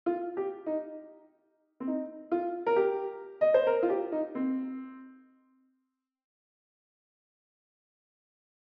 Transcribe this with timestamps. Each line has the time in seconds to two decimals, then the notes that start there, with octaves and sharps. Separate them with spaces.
0.06 F4
0.37 G4
0.66 D#4
1.80 C4
1.87 D#4
2.32 F4
2.66 A#4
2.76 G4
3.41 D#5
3.54 C5
3.67 A#4
3.83 F4
3.90 G4
4.12 D#4
4.35 C4